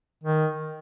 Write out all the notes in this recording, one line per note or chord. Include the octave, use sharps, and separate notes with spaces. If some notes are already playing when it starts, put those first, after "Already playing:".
D#3